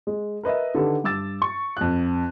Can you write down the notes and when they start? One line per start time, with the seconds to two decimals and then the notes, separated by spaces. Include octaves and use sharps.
0.07 G#3
0.43 A#4 B4 D#5 E5
0.75 D3 D#3 G4 A4 B4
1.04 G2 D6 E6 A6
1.42 C#6
1.77 F2 F#6